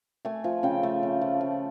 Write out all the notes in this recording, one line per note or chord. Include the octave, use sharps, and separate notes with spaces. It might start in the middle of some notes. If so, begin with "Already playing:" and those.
A3 G#5
F3
C#3 G5
A3
C#3
F3
F3